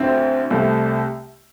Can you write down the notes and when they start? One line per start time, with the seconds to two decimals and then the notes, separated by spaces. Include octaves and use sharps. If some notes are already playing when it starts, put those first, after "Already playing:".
Already playing: D2 D3 C4 E4
0.51 C2 C3 A3